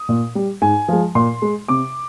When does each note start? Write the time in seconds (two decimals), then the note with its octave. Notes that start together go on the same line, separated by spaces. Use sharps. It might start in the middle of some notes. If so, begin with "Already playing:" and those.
Already playing: D#6
0.09 A#2
0.35 G3
0.62 G#2 G#5
0.88 F3 G#3
1.15 A#2 C6
1.42 G#3
1.68 C3 D6